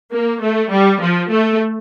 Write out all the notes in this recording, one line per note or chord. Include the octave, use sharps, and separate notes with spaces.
A#3
A3
G3
F3
A3